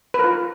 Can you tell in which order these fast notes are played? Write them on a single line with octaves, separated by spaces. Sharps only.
B4 A#4 F4